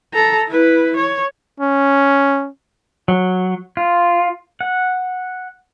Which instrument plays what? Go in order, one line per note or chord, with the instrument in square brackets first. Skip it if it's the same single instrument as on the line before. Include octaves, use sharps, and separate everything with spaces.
[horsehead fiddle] A4 A#5
E4 B4
C#5
[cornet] C#4
[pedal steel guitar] F#3
F4
F#5